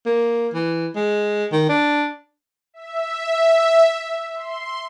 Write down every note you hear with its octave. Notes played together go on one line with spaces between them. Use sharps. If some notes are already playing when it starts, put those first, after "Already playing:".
A#3
E3
G#3
D#3
D4
E5
C6